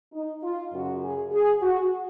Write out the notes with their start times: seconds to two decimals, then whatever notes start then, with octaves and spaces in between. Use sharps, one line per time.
0.13 D#4
0.43 F4
0.73 F#2 C#3 F#4
1.02 G#4
1.32 G#4
1.62 F#4